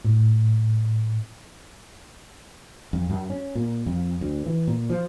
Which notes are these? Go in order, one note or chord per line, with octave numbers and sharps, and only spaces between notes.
A2
F2
F#2
C#4
A#2
F2
D2
E3
A#2
F3